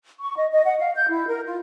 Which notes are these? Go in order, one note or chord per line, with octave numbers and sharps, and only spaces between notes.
C#6
D#5
D#5
F#5
F5
G6
E4
A#4
F4